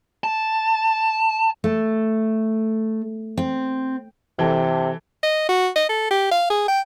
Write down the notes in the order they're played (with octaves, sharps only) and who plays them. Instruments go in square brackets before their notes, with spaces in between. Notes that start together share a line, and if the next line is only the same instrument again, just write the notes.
[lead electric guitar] A5
[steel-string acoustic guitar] A3
C4
[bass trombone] C3 [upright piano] E3 A4
[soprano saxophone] D#5
F#4
D#5
A4
G4
F5
G#4
G5